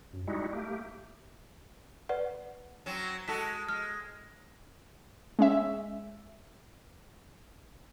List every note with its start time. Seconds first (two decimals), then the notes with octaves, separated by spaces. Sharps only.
0.13 F#2
0.27 G3 G#3 D#4 E4 F#4
0.53 A3 A#3 G4
2.09 B4 D5 F#5
2.86 F#3 C4 C#4
3.28 G#3 F#4 A4 B6
3.69 G#3 F6
5.39 G#3 C#4 E5